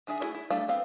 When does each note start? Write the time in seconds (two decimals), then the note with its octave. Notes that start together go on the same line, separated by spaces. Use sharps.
0.07 D#3 D4 G#4 E5
0.20 A3 D4 E4 F#4 G#4
0.35 E4
0.50 G3 A3 D4 A4 F5
0.68 B3 C4 F5